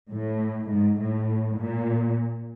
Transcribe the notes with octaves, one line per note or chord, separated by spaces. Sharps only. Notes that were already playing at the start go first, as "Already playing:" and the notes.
A2
G#2
A2
A#2